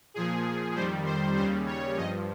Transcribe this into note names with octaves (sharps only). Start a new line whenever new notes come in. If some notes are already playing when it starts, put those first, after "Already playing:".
A#2 F3 G#4
F2 D#3 G3 C5
C5
D#2 C#3 G3 C5
C#5
G2 F3 D#5